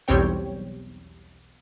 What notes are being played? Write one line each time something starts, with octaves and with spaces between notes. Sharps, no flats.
B1 E2 G3 C4 C#5 G5